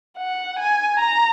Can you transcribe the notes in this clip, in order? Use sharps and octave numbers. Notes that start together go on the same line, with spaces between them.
F#5
G#5
A#5